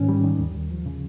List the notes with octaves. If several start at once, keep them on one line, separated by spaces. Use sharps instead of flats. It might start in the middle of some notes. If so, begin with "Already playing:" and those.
Already playing: G#2 D#3 C#4
G3
D#3
D#2
D#2
F3
C#3